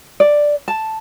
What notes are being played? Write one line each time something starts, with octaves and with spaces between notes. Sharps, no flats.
D5
A5